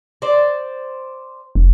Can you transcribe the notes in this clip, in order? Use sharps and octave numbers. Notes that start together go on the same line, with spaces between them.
C5 D5
F1